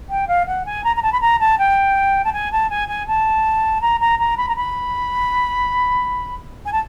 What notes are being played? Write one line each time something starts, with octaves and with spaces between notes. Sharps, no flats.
G5
F5
F#5
G#5
A#5
A#5
A5
B5
A#5
A5
G5
A5
G#5
A5
G#5
G#5
A5
A#5
A#5
A#5
B5
A#5
B5
G#5
A5